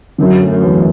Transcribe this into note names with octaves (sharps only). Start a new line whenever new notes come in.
F#2 D3
A3
F#2
E2